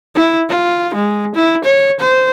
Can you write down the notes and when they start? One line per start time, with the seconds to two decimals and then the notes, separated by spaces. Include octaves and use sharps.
0.15 E4
0.49 F4
0.95 G#3
1.35 E4
1.64 C#5
2.00 C5